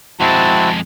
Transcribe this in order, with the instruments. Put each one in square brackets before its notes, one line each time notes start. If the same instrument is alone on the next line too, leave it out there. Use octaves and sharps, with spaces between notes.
[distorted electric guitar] F2 G#3 [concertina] C4 E4 F#4 [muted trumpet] A5